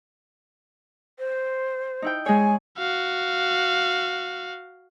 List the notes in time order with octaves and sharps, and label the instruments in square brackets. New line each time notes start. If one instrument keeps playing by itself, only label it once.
[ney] C5
[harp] D#4 E4 G5
[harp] G#3 C#5 [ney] G#5
[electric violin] F#4 F5